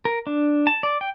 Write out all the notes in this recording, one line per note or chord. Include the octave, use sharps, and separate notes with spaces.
A#4
D4
A5
D5
G5